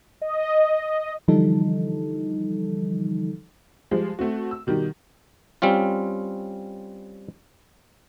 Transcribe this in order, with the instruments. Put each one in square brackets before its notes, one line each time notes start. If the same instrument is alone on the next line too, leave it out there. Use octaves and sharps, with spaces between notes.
[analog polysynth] D#5
[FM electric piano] D3 E3 F3 G3 D#4 A4
[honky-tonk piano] F3 G3 G#3
A3 C4 F#4
E6
B2 D#3 G3
[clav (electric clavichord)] G3 C4 C#4 F4